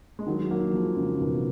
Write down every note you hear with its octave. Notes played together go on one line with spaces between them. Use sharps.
G#3
D#3 F#3
F#3 A#3
F3 G#3
C#3 F3
B2 D#3